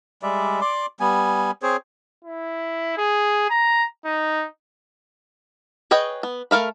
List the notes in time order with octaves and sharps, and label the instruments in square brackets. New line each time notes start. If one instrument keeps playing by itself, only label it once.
[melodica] G3 G#3 D5 E5
D5 C6 D6
G3 B3 G#5
C4 G#4 C5 C#5
[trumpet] E4
G#4
A#5
D#4
[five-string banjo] G#4 B4 C#5 D#5 G5
B3
A3 A#4 F5 B5